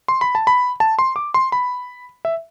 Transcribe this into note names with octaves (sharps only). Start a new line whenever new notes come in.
C6
B5
A5
B5
A5
C6
D6
C6
B5
E5